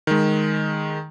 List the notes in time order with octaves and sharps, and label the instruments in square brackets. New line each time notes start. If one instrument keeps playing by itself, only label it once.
[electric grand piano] D#3 G#3